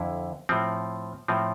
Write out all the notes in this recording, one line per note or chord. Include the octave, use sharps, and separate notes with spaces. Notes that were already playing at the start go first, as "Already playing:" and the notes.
Already playing: F2 D3 E4
A2 F3 C4
A2 F3 C4